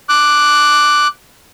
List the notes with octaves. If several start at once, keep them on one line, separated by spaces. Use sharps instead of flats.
D6 F#6